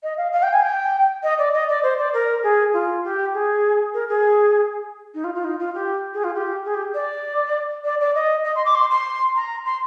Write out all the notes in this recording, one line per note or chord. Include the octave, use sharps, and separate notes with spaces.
D#5
F5
F5
G5
G#5
G5
D#5
D5
D#5
D5
C5
D5
A#4
G#4
F4
G4
G#4
A#4
G#4
D#4
F4
F4
D#4
F4
G4
G#4
F4
G4
G#4
G4
D5
D5
D5
D#5
D#5
C6
D6
C6
C6
A#5
C6